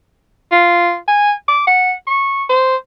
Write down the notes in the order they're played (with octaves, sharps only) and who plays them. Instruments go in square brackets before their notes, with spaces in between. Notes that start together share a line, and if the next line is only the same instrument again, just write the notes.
[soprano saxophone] F4
G#5
D6
F#5
C#6
C5